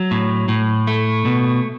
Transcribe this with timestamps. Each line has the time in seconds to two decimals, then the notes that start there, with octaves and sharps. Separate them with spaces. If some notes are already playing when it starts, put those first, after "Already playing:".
Already playing: F#3
0.11 A2
0.48 A2
0.87 A3
1.25 B2